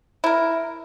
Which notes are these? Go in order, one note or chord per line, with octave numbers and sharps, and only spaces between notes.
E4 A#4